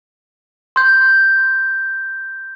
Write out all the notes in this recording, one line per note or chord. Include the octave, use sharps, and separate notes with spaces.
C6 G6